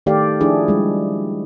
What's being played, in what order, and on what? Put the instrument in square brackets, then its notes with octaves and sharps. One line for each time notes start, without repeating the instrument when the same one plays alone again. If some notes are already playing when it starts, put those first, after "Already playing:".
[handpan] D#3 A3 G4 A4 D5 F5
F3 D4 E4 G#4
G3 G#3